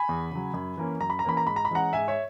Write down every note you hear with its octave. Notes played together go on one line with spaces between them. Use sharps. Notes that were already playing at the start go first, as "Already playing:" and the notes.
Already playing: G#5 B5
E2
C#3 F#3
F#2
E3 A#3 C#4
F#2 A#5
B5
A#5
E3 A#3 C#4 B5
A#5
G#2 B5
A#5
B5
E3 G#3 C#4 F#5 A#5
G#2 E5 G#5
C#5 E5